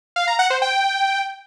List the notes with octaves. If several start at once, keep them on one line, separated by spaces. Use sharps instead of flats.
F5
A#5
F#5
C5
G5